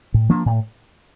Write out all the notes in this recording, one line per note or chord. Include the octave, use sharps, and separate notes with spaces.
A2
F3 A#3 D4
A2